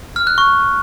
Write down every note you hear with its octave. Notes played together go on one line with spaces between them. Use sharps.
F6
F#6
C#6